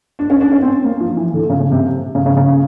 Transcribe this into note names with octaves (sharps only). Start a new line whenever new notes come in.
D4
C#4
D4
C#4
C4
A#3
F3
E3
D3
C#3
C#3
C3
C#3
C#3
C#3